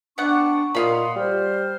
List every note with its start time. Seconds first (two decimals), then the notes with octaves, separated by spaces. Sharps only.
0.18 B3 D4 F#5 G5 C#6
0.75 A#2 D#5 F5 F#5 B5 C6
1.16 G3 C5 F6